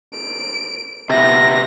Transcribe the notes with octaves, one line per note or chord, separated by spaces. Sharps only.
D7
C3 B3 E5 A#6